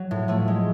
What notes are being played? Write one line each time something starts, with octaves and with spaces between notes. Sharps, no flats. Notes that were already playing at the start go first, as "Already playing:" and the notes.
Already playing: F#3
A2
F3 A3
G#3